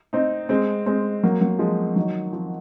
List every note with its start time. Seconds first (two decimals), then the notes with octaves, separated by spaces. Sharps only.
0.13 C4 D#4
0.49 G#3 C4
0.86 G#3 C4
1.23 F#3 A#3
1.41 F#3 A#3
1.59 F3 G#3
1.96 D#3 F#3
2.33 F3